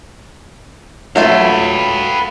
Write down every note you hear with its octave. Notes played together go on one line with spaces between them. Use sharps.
F#3 A3 F4 B4 F5